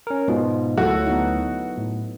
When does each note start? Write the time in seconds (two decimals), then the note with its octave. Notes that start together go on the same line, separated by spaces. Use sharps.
0.07 C#4 A#4
0.28 G#2 B2 F4
0.77 D2 F#3 A3 E4 F#4 A4
1.07 B3 D#4
1.78 A2